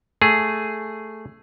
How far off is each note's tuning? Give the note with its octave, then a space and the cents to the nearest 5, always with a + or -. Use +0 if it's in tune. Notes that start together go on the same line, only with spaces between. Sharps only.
A3 +0 G#4 +0